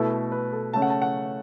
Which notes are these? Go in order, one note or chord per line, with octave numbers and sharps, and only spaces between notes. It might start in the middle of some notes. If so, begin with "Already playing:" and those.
Already playing: B2 A3 E4 A4
A4
B4
A4
C#3 A3 C#4 A5
F#5
A5
F#5